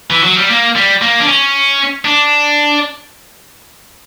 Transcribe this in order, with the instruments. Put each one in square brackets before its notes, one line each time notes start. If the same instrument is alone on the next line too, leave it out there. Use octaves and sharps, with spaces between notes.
[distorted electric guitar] E3
F#3
G3
A#3
G3
A#3
D4
C#4
D4